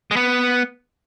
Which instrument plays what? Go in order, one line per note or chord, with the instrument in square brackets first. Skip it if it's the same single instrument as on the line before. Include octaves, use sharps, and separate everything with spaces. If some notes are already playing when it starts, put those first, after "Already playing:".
[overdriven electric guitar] G#3
B3